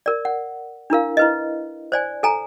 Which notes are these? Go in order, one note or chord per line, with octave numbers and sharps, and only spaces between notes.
A#4 D5
F#5
D4 E4 A#4 F5
E4 B4 D#5
C5 D5 G#5
A4 G#5 A#5